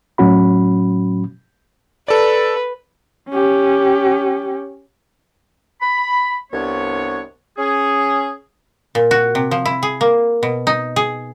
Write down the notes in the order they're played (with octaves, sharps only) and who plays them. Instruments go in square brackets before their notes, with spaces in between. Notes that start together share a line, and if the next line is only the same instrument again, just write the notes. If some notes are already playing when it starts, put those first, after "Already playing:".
[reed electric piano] A2 F#3 C#4 F#4 B5
[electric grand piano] A4 D5 [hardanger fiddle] B4
[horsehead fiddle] C#4 G4
[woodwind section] B5
C2 G2 B3 D4 C#5
C#4 G#4
[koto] A#2
F#4
C3
F3
E4
G#4
A#3
B2
D#4
G#4